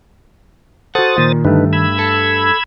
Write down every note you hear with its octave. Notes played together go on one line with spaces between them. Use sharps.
F#4 A4 C5 F#5 D#6 A6
A#2 D#3
G2 D3 A3 D#4 B4
B5 E6 G#6
A4